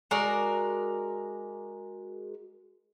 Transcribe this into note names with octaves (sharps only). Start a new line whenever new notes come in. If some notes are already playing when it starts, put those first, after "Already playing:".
G#3 F#4 A#4 D5